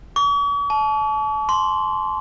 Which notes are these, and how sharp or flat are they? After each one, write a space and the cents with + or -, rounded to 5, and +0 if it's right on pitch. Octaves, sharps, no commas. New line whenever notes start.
C#6 +45
A5 -35
C6 +0